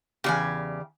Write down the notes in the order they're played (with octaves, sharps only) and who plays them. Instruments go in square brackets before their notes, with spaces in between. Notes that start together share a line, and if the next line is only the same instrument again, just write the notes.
[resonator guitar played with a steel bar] E2 C#3 [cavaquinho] G4 D5 G#5